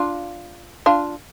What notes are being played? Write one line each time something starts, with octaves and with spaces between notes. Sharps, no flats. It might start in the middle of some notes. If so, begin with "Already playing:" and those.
Already playing: D4 F4
D4 F4